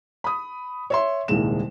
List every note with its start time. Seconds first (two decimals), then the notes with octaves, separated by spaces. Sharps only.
0.24 B5 D#6
0.90 C#5 E5 C6
1.28 D#1 C2 G#2 G#3 A#3 E7